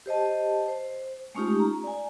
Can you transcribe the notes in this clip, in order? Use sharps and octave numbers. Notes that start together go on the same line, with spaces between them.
G4 C5 D#5 A5
C5
G#3 A3 C#4 D#4 F4 G4
A#5
D5 G#5